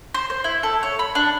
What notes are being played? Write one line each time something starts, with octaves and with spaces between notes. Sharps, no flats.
C5
C5
E4
A4
C#5
B5
D4